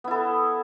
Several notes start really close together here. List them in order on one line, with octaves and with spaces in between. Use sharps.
B3 E4 A4